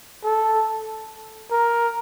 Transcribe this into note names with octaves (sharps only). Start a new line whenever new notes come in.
A4
A#4